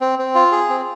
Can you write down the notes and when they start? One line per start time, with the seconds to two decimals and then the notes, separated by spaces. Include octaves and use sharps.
0.01 C4
0.19 C4
0.35 F4
0.52 G#4
0.69 C4